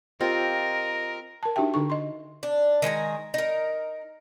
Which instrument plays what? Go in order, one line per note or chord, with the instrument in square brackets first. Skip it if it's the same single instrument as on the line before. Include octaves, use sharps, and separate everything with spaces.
[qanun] C4 F4 G4 [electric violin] A#4 [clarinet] D#5
[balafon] A#4 A5
D4 D#4 F#4 G4 E5 G5
D3 D4 D#4 A4 C#6
D#5 C6
[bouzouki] D4
D#3 G#3 G#5 A#5
D#4 A#4